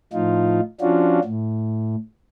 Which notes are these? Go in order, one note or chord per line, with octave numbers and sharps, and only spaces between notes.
A2 F3 D#4 F4
F3 C#4 D4 F4 F#4
A2